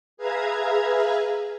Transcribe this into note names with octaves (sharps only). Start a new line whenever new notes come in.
G#4 B4 E5 F5 A#5 G#6